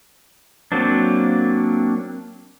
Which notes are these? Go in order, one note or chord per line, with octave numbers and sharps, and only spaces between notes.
F#3 A#3 C4 D4